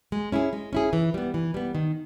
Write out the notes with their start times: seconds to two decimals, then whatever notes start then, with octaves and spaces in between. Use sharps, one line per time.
0.12 G#3
0.32 C#4 E4 G#4
0.53 G#3
0.73 C#4 E4 G#4
0.93 E3
1.14 G3 B3
1.34 E3
1.54 G3 B3
1.75 D#3